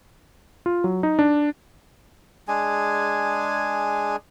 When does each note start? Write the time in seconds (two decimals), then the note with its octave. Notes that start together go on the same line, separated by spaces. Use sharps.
0.66 F4
0.84 F#3
1.03 D#4
1.19 D4
2.48 G#3 D4 G#4 G#5